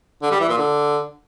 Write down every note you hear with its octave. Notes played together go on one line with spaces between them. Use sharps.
D3
G3
E3
A#2
D3